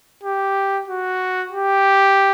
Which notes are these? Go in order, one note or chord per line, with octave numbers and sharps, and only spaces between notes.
G4
F#4
G4